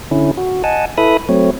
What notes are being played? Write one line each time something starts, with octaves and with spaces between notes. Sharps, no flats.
D3 C#4 E4
F#4
D#5 F#5 G#5 A5
E4 A4 B4 E5 B5 D#6
F#3 A3 C4 C#5